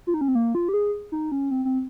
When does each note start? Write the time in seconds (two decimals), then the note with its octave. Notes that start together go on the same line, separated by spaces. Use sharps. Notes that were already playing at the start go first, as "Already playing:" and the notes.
0.07 F4
0.14 D#4
0.21 C#4
0.28 C4
0.35 A#3
0.55 F4
0.69 G4
0.74 G#4
1.12 D#4
1.32 C#4
1.51 C4
1.65 C4